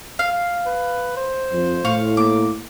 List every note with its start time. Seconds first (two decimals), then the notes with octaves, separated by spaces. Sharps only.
0.19 F5
0.66 B4
1.17 C5
1.51 F2
1.85 A2 F5 C#6
2.17 A#3 D6